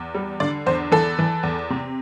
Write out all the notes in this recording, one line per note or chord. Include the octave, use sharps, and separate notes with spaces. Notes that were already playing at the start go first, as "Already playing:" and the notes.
Already playing: E2
G3
D3 D5
E2 C5
E3 A4
E3
E2
C3